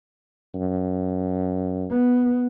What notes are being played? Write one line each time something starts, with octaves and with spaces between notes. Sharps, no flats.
F#2
B3